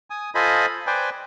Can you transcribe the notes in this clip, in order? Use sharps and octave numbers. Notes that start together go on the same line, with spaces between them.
G#5 D#6
F4 A4 C5 D#5 G#5 B5
B4 C5 D5 G5 G#5